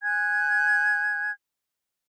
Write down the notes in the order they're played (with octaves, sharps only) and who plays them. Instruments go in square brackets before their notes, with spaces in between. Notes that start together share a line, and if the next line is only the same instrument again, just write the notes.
[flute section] G#5 F#6 G#6